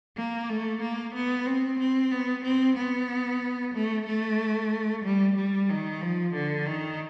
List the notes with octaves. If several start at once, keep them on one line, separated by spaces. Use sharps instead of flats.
A#3
A3
A#3
B3
C4
C4
B3
C4
B3
A3
A3
G3
G3
D#3
F3
D3
D#3